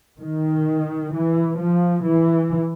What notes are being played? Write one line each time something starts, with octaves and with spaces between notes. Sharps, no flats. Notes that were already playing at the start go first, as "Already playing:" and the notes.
D#3
E3
F3
E3